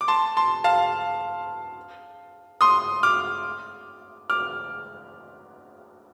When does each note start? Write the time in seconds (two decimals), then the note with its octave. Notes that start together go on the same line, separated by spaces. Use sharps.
0.01 D6
0.08 A5 C6
0.37 A5 C6
0.64 F5 A5
2.61 C6 D#6
3.03 D6 F6
4.30 D6 F6